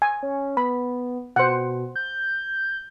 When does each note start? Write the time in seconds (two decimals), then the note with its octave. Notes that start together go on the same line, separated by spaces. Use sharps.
0.02 G#5
0.23 C#4
0.57 B3 B5
1.36 B2 C5 F#5
1.96 G6